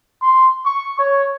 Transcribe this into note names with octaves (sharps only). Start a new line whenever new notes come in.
C6
C#6
C#5